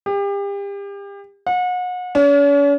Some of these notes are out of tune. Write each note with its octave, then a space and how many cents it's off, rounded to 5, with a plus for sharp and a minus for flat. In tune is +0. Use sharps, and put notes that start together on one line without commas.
G4 +35
F#5 -35
C#4 +45